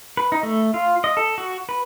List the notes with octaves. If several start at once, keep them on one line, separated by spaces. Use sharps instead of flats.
B4
D#4
A3
F4
D#5
A4
F#4
B4